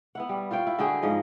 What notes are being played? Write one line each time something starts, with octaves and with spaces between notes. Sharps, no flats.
B3 E4 F#5
G3
F4 C5 C#5 G5
E4
D3 F#4 G#4 G5
G#2 F3 D#5